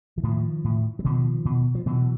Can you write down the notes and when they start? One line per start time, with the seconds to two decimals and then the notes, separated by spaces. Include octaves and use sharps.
0.18 E3
0.23 A2 D#3 F3
0.64 A2
0.99 F#3
1.05 B2 D#3 F3
1.45 B2
1.75 F3
1.86 B2 E3 F#3